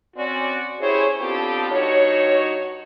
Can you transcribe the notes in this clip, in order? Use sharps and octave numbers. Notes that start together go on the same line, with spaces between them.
C4 C#4 F#4 D5
C#4 E4 G4 G#4 C5 C#5
B3 C4 D4 F4 G4 A4
G2 D#4 F#4 C#5